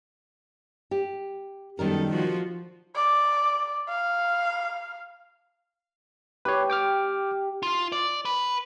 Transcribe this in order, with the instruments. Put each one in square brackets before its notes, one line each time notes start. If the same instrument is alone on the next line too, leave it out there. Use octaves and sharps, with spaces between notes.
[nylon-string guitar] G4
[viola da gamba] F#2 B3 A4 [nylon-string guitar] D#3 G3 A#4
[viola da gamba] F3 F4 F#4
[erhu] D5
F5
[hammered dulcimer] G4 [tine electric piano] B4 C#5
[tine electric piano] G5 D6 F6
[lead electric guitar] F4
D5
B4